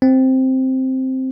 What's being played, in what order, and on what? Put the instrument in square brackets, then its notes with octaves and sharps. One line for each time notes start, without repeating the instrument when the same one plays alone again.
[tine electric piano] C4